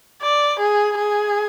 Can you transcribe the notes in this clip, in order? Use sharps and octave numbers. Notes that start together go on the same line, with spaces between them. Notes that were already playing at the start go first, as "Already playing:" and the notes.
D5
G#4
G#4